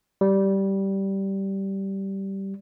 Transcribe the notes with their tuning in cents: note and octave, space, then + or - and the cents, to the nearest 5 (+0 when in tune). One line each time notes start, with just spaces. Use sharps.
G3 -10